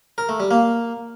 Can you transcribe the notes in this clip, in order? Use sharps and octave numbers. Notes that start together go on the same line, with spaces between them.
A#4
A3
G3
A#3